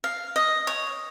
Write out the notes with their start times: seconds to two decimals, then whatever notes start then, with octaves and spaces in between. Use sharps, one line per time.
0.04 F5
0.36 D#5
0.67 C#5